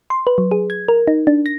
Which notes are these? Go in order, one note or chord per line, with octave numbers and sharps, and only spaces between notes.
C6
B4
F#3
G#4
G#6
A#4
D#4
D4
A#6